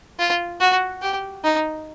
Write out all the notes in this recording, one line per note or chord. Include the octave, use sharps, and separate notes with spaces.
F4
F#4
G4
D#4